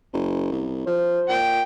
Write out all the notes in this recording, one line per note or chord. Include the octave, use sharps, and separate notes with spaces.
F#1
C2
F3 C5
A#2 G5